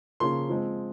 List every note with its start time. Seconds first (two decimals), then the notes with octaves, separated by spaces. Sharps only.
0.20 C#3 F3 A#3 C6
0.50 F3 G#3 C4